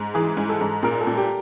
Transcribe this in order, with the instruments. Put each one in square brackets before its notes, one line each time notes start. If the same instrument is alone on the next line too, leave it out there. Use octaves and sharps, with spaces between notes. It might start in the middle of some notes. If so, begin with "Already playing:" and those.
Already playing: [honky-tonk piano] G#2
[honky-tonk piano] E3 [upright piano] G#4
[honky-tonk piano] G#2
[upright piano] A4
[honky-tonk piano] G#2
[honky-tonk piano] A#2 [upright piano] A#4
[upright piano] A4
[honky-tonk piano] A#2
[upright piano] G4